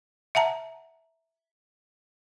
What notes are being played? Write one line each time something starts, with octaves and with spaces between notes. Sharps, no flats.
E5 F#5 A5 A#5